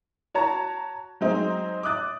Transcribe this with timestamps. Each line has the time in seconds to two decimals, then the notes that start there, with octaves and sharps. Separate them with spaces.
0.34 F#4 C#5 A5 A#5
1.21 F#3 G#3 C4 D#4
1.83 D6 D#6 F#6 A6